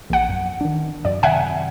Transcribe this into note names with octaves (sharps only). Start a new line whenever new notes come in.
A#1 F#5
F#2
D#3 D4
F#2 D5
F#2 C3 D#3 E5 F#5 G#5